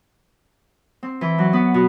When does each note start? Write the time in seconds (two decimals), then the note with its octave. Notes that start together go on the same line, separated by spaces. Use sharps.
1.03 C4
1.21 E3
1.38 F#3
1.53 B3
1.74 B2